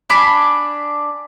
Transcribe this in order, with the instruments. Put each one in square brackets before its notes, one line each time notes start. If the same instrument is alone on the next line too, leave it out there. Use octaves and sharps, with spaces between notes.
[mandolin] D4 G#5 B5 D6